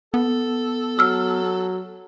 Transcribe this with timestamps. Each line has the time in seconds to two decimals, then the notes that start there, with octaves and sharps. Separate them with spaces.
0.14 B3 A4
0.99 F#3 E6 F6